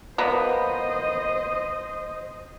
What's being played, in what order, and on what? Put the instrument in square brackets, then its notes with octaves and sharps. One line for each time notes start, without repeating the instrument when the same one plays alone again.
[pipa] A#3 B3 [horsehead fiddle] C5 D#5